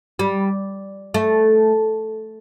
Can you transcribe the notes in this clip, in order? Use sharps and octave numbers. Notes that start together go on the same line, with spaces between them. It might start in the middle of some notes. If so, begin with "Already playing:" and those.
G3
A3